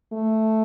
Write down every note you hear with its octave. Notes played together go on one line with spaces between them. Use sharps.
A3